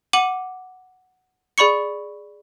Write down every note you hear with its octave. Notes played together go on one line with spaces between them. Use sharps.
F#5 D6 D#7 F#7
G#4 D5 B5 C#6 C#7